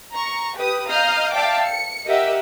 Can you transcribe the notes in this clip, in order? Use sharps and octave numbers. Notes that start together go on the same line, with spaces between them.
A#5 C#6
G4 B4 D#6
D#5 F5 A#5 D#6 F6 G6
D5 E5 F5 G5 A5 D6
C#7
G4 A#4 D#5 E5 F#5